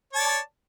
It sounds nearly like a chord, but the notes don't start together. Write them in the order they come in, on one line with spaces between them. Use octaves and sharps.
C#5 A5 D5